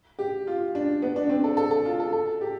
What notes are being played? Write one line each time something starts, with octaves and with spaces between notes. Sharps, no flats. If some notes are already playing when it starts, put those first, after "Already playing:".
G4
F4
D4
B3
D4
C4
A4
A4
A4
F4
A4
A4
G4